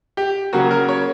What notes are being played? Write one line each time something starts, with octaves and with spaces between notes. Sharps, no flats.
G4
C#3 F#3 A#3 F#4
A#4
C#5